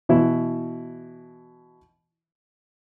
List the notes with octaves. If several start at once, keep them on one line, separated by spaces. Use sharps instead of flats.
B2 E3 E4